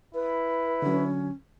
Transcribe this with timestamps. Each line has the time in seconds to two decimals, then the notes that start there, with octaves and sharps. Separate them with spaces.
0.15 E4 B4
0.82 D3 F#3 C#4